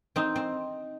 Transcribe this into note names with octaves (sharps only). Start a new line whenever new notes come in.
C4 D#4
C4